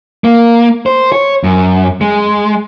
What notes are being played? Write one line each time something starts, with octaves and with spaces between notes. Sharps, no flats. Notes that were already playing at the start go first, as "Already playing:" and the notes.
A#3
C5
C#5
F#2
G#3